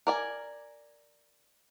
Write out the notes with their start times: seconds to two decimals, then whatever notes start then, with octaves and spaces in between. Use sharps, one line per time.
0.07 A#4 D5 G#5